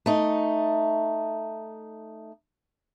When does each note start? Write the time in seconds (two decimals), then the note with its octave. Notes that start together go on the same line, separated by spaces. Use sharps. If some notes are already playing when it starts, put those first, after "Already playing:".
0.06 A3 D#4